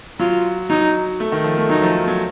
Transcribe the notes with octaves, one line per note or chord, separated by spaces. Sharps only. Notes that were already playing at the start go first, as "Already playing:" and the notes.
F#3 F4
F#3 D#4
A3
D#3
F3
A3
F#3 D#4
F3
F#3